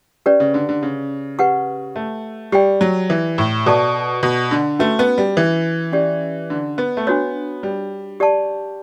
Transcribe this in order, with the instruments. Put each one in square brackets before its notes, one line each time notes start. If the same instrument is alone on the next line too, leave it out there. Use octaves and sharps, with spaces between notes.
[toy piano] C#4 G4 B4 D5
[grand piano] C#3
D3
D3
C#3
[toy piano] G4 B4 F#5 C#6
[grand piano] A3
[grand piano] G3 [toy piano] G4 D5 G5
[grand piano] F#3
E3
A2
[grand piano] B2 [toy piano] A4 D5 A5 C#6
[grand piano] B2
D3
[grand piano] A3 [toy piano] C#4 F#4 B4
[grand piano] B3
G3
E3
[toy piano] C#4 G4 D5
[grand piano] D3
B3
A3
[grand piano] B3 [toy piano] D4 F#4 C#5
[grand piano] G3
[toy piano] G4 D5 A5 C#6